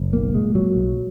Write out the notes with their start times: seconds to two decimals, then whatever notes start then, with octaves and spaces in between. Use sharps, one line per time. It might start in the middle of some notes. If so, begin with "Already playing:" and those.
Already playing: F#1
0.13 B1 A#3
0.34 A#2 G#3
0.55 A#2 F#3
0.76 B1